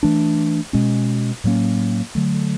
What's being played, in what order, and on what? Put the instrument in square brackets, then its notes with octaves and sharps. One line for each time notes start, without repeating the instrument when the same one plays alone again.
[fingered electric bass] E3 A3 D4
B2 G#3 C#4
A2 F#3 A#3 C#4
D3 F#3 A3